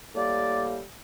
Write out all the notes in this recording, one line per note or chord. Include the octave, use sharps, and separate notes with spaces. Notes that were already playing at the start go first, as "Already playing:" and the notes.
A2 G3 A#3 D5